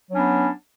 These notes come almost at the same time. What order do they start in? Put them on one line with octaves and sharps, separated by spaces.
F#3 D4 C#4 B3